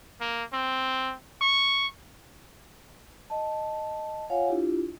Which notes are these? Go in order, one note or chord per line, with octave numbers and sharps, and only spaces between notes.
A#3
C4
C#6
D#5 A5
F4 C#5 F5 F#5 G#5
D4 E4 F4 G4